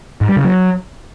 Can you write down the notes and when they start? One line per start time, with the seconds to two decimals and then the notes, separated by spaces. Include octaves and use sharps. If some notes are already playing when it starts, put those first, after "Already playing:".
0.21 G#2
0.29 G3
0.37 C#3
0.44 F#3